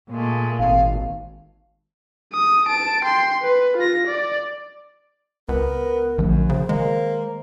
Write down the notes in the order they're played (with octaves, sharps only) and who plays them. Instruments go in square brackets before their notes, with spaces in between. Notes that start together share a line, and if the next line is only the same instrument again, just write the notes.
[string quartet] A#2 G#3 A3
[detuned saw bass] G#1 [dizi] F5
[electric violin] D#6
A5 D7
G5 C6
B4
F4 A#6
D5
[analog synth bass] C#2 [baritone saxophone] B3 [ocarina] A#4
[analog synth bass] A#1 [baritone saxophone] F#2 [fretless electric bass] D3 F3 A3
[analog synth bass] C#3 [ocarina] C5
[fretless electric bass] D#3 [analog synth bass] G#3 [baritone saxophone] A#3